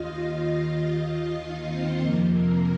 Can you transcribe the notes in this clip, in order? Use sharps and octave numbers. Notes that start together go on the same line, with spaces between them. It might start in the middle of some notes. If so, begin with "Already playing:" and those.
Already playing: D#2 D#3 F4 D#5 F5
D#4 D#5
C4 C5
F2 C3 F3 A#3 A#4
A#3 A#4